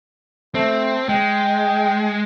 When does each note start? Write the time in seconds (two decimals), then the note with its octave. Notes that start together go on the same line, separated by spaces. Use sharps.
0.55 A3 C4
1.09 G#3 G5